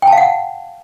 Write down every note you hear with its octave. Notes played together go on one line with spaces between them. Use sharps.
G5
A5
F5
F#5